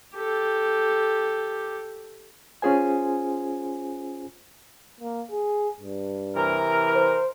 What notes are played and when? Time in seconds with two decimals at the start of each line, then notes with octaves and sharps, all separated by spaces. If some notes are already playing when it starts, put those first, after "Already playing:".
0.16 G4 A4
2.62 C#4 F4 G#4 C5 G#5
5.00 A#3
5.31 G#4
5.81 G2
6.36 C3 E3 A#4
6.94 C5